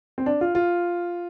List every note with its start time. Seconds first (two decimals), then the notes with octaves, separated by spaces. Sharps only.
0.18 C4
0.26 D4
0.41 F4
0.55 F4